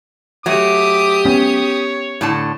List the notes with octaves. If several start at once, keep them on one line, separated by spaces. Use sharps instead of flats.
F#3 A3 G4 D6 D#6
B3 C#4 C#5
A2 D3 A5